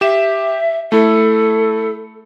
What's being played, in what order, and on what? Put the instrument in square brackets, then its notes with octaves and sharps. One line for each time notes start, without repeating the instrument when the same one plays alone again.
[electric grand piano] G4 E7 [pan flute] E5
[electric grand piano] A3 E4 [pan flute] A4